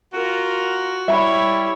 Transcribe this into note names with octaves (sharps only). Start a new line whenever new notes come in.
F4 F#4 A#4
G3 E4 C#5 E5 B5